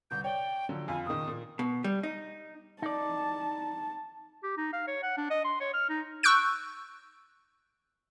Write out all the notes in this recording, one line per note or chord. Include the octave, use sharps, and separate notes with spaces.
G1 C2 G6
C#5 D5 G5
D3 F3 F#3
F2 F4 G#5 B5
F#1 A#2 D#3 D#6
A#2 A#3
B2
G3
D#4
D#4 D5 A5
G4
D#4
F5
C#5
F#5
D4
D#5
C6
C#5
F6
D#4
C#6 E6 F#6 G6 D7